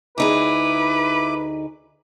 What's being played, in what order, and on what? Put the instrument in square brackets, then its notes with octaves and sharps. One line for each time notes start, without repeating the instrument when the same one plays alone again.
[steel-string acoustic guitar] D2 D#4 G#4 [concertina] E4 D6 [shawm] B4